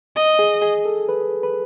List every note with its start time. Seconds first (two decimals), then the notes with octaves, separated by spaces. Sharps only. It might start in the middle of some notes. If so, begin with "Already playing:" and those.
0.16 D#5
0.39 G#4
0.62 G#4
0.85 A4
1.09 B4
1.43 B4